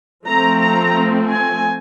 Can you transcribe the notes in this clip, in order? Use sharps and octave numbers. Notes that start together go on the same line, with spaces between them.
F3 A3 C4 A#5
A#5
G#5